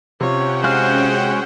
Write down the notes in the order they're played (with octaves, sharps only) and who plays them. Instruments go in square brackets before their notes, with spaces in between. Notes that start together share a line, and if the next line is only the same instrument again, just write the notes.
[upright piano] C3 F4 [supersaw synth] C#4 F#5 G5 [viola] C#5
[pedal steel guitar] G#3 F#4 F5 [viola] G#4 C5